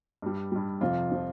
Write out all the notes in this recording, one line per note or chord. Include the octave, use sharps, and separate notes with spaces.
G2 G3
G2 G3
F2 C3 F3 F4
C3 F3